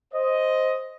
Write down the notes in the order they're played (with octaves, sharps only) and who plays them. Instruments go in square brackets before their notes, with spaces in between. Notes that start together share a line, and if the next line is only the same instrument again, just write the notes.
[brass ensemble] C5 D#5